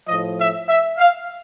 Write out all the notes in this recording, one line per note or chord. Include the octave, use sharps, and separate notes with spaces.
A2 F3 D#5
E5
E5
F5